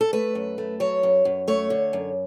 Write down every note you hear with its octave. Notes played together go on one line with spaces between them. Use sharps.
A4
A3 B4
F#2
A3
F#3 C#5
F#2
F#2
A3 C#5
D3
F#2